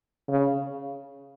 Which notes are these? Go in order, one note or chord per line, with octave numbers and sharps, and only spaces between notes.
C#3